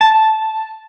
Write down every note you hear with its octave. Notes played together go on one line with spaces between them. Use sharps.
A5